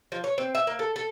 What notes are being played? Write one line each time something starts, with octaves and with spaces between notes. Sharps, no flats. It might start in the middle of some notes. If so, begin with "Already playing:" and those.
F3
C#5
C4
E5
A#3
A4
A4